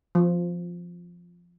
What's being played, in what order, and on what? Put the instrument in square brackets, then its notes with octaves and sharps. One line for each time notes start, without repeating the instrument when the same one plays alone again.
[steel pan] F3